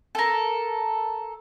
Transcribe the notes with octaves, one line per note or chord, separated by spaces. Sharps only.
A4 A#4